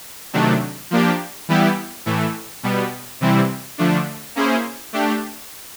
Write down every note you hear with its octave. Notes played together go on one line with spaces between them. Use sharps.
C3 D#3 F#3 A3 D4
F3 A#3 D4 G4
E3 G3 B3 E4 G4
A2 E3 A3
B2 G3 B3
C3 E3 G3 C4 E4
D3 F3 A3 D4
A#3 C#4 E4 G#4 C5
A3 D4 G4